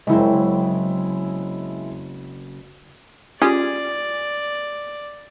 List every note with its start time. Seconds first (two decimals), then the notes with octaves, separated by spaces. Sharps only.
0.07 F#1 F#3 G#3 C4 E4
3.42 C#4 F4 G4 G#4 D5